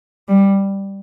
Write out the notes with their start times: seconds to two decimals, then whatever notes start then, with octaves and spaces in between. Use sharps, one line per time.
0.28 G3